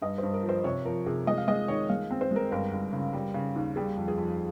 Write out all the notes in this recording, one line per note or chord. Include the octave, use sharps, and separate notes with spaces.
G2 D#5
G2 C5
A#4
F3
C5
C3 C#5
F3 A#4
C3 G#4
G#3 D#5
F5
G#3 D#5
D#3 C#5
G#3 F5
C4
C5
G#3 A#4
G1 A#4
G1
C#3
G3
C#3
D#2
G3 G#4
F2
G#4
F2